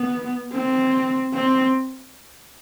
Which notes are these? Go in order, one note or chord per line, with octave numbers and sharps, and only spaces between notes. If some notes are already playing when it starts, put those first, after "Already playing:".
Already playing: B3
C4
C4